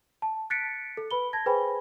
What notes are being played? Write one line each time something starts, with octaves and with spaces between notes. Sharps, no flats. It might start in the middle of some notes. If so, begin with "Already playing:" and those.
A5
F#6 A6 B6 C#7 D7
A4
B4 B5 G7
A5 G#6 A#6
G#4 B4 C5 G5 G#5 B5